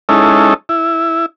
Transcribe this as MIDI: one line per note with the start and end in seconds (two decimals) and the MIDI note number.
0.09 0.54 56
0.09 0.54 61
0.09 0.54 63
0.09 0.54 64
0.09 0.54 69
0.69 1.26 64